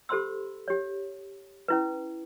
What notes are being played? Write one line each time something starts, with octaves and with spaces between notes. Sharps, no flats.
G4 A4 C5 B5 C6 E6
G4 C#5
C#4 E4 B4